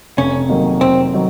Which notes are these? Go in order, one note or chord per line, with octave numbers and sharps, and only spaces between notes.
F1 C#4
F2 D#3 F#3 A#3
F1 C4
D#3 F#3